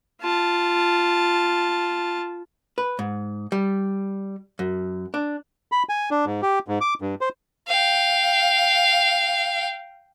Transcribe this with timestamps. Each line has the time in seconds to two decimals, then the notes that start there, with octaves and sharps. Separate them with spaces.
0.21 F4 A5
2.78 B4
2.99 G#2
3.52 G3
4.59 F#2
5.14 D4
5.72 B5
5.89 G#5
6.11 D4
6.26 G#2
6.42 G4
6.68 G#2
6.81 D6
7.01 G2
7.21 C5
7.68 F5 G5